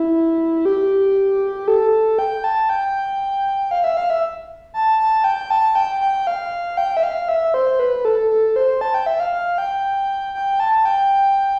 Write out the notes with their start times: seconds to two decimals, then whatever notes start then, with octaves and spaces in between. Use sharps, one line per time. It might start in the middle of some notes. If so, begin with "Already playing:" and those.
Already playing: E4
0.65 G4
1.68 A4
2.19 G5
2.44 A5
2.69 G5
3.71 F5
3.84 E5
3.97 F5
4.10 E5
4.74 A5
4.99 A5
5.24 G5
5.50 A5
5.75 G5
6.01 G5
6.27 F5
6.77 G5
6.97 E5
7.03 F5
7.29 E5
7.54 C5
7.79 B4
8.05 A4
8.30 A4
8.56 C5
8.81 A5
8.94 G5
9.06 E5
9.20 F5
9.33 F5
9.58 G5
10.34 G5
10.60 A5
10.85 G5